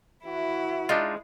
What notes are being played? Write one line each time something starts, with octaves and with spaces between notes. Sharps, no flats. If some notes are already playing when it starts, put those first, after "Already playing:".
E3 E4 F#4
G#3 D4 D#4 F4